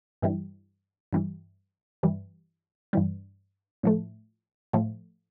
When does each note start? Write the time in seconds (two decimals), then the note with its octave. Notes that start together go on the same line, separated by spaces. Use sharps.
0.22 G2 E3 G3
1.13 G2 E3 G3
2.03 G2 E3 G3
2.93 G2 E3 G3
3.83 A2 F3 A3
4.73 A2 F3 A3